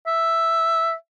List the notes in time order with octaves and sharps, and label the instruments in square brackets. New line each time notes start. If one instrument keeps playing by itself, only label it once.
[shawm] E5